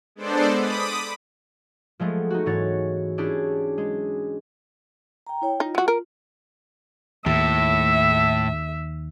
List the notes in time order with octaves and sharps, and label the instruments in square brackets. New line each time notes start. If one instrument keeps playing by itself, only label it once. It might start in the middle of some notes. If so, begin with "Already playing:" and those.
[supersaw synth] G#3 B3 D4 A4 C5 D5
B5 D6 D#6
[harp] F3 G#3 A3 B3
D#4 F#4
G#2 E3 F#4 C#5 A6
C#4 D4 E4 G4 G#4
G#3
[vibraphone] G5 A#5
E4 C#5 G5
[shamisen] D#4 [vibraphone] F4
[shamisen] F#3 F#4
A#4
[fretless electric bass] D#2 [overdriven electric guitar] A2 [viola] E5